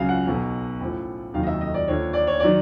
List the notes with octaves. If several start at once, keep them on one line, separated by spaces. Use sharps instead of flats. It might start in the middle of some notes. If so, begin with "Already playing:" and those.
Already playing: C#2 C#3 F#3 F5
F#5
B1 B2 F#3
A1 A2 F3
F1 D#2 D#3 F#3 F5
D#5
E5
D#5
D5
D#2 D3 F3 C#5
D5
C#5
D#3 F#3 D5